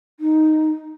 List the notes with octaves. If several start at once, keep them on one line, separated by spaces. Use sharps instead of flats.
D#4